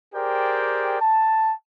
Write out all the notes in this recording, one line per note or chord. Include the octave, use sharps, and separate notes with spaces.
G4 G#4 A#4 C5 D5 G5
A5